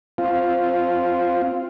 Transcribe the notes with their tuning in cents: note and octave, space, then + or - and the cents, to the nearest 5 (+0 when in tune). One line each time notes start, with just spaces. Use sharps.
C4 +0 F4 +0